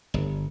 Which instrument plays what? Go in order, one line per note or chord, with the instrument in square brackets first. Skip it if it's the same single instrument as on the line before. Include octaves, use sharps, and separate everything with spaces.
[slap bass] G1